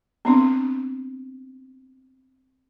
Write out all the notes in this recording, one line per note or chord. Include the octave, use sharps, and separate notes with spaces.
B3 C4 D4